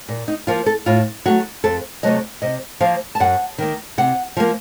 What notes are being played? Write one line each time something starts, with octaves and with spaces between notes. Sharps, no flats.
A#2
D#4
F3 A#3 F4
A4
A2 F4
F#3 A3 F#4
F2 A4
C3 F#3 A3 D#5
C3 D#5
F3 A#3 F5
A5
F#2 F#5
D#3 A#3
C3 F#5
F3 A#3